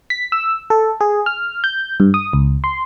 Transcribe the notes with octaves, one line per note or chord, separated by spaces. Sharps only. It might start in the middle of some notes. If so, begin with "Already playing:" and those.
B6
E6
A4
G#4
F6
G6
G2
D#6
C#2
C6